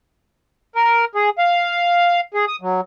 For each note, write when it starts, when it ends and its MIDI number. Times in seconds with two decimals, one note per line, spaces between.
0.76 1.05 70
1.15 1.30 68
1.39 2.21 77
2.34 2.45 68
2.48 2.56 87
2.61 2.81 54